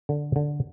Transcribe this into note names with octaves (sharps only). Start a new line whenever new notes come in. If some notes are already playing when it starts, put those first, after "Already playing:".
D3
D3